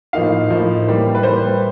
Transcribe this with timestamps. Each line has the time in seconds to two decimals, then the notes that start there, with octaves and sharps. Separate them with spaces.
0.13 A2 F3 A#3 D#4 F5
0.50 A2 F3 A#3 D#4
0.86 E3 G3 A#3
1.15 B4
1.23 E3 G3 A#3 C5